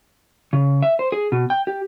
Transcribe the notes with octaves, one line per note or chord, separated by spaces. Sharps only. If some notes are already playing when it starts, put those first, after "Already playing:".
C#3
E5
C5
G#4
B2
G5
G4